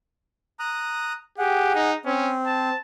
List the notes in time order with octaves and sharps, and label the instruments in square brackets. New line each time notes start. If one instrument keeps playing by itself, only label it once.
[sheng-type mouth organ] A#5 D#6 F#6
[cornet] G4 [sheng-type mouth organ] G#4 F#5
[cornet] D#4
[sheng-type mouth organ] C4 [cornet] C#4
[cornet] A5